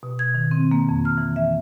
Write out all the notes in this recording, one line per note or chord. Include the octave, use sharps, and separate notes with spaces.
B2
G#6
D#3
C4
A#3
F2
F6
E3
E5